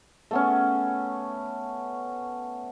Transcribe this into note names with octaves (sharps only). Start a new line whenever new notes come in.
A3 B3 C#4